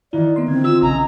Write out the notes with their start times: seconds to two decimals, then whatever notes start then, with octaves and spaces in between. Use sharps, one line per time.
0.13 D#3 E3 E4 D5
0.36 B3 C6
0.48 D3 C4 G#6
0.64 F4 E6
0.82 A#1 C#3 D#5 E5 G#5 A#5